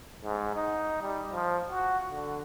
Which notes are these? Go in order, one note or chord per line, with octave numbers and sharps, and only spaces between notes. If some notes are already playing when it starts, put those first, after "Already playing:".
G#2
D#4
G3
F3
F#4
D3